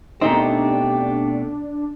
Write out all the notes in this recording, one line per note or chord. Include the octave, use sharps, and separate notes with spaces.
B2 A3 C4 D4 D#4 G4 D#5 C6